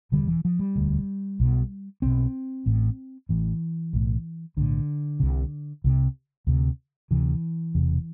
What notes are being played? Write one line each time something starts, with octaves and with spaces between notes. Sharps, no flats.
E1 D2 D3 G3
D3
E3
F3
G3
E1 D2 D3
B1 B2
B1 B2 C4
A1 A2
A1 A2 E3
B1 A2
B1 A2 D3
C2 C3
C2 C3
D2 C3
D2 C3 E3
E1 E2 C3